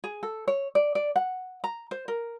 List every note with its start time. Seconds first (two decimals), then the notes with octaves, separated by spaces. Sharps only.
0.04 G#4
0.23 A4
0.48 C#5
0.75 D5
0.95 D5
1.16 F#5
1.64 A#5
1.91 C5
2.08 A#4